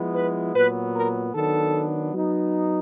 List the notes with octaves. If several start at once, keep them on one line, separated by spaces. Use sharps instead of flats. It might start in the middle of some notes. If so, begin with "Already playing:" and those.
Already playing: F3 G#3 B3 E4
B4
A#2 F#3 B3 B4
A#4
D#3 F#3 B3 D4 A4
F#3 B3 D#4